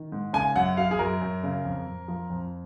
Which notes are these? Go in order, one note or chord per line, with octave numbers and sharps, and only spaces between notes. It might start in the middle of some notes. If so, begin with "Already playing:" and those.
Already playing: D#3
G#2
C#3 G#5
F#2 F#5
F#3 F5
G#4
F#2 A#4
F#2
C#3
F2
F2
F3
F2